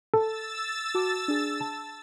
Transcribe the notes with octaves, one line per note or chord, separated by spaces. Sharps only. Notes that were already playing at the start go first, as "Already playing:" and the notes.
A4 E6 A6
F#4 A5 D6
D4 G#4
A5